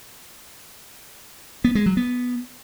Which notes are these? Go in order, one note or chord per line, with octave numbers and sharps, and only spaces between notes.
B3
G#3
F#3
B3